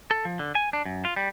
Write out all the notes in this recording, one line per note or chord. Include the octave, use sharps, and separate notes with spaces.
A4
F3
D3
G#5
D4
F#2
F4
G3